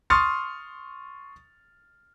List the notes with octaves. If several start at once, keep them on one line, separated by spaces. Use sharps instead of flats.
C6 C#6 D#6 F6 A6 C#7